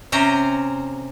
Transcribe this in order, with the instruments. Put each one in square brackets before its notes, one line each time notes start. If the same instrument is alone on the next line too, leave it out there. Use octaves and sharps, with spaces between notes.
[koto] C3 C#4 C5 A#5